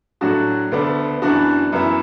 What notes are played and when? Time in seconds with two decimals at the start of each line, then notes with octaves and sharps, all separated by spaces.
0.21 A2 F#3 D4 F#4
0.72 D2 D3 B3 D4
1.22 F#2 E3 B3 D4 F#4
1.72 F#2 E3 B3 E4